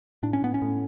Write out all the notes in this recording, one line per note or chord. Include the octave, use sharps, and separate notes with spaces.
A2 D4
C#4
A2 B3
C#4
A2